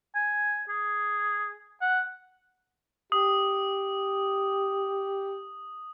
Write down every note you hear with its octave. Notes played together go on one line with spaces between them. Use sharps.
G#5
G#4
F#5
G4 D#6